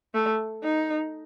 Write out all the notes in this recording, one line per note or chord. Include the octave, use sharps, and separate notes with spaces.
A3
D#4